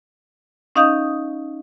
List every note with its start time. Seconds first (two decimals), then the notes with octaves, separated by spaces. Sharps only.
0.75 C#4 D#4 D#5 F5 D#6 G6